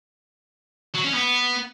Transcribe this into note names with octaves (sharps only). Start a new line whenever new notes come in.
F#3
C#4
B3